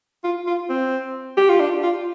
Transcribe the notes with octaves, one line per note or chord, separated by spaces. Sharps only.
F4
F4
C4
G4
F4
D4
F4